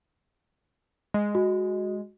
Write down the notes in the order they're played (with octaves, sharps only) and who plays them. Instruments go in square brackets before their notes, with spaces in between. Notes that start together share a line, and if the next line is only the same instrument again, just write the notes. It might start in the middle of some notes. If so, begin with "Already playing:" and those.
[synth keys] G#3
[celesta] F#4